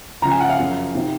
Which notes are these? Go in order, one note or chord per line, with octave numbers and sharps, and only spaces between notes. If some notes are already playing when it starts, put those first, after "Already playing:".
C#2 C#3 F3 A#5
G#5
F#5
F5
F#2 C#3 F3
C3 D#3